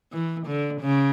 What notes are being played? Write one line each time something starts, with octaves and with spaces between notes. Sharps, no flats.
E3
D3
C#3